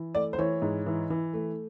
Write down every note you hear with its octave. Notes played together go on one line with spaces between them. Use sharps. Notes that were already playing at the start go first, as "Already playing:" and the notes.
Already playing: E3
A3 D5
C5
E3 C#5
G#2
E3
E3
A3